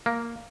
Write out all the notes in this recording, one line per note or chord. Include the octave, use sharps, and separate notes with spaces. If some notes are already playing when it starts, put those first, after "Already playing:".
A#3